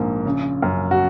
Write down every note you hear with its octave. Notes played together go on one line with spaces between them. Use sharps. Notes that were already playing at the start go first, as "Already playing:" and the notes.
Already playing: A#1 G#2 A#3
C#3
F#2
F#4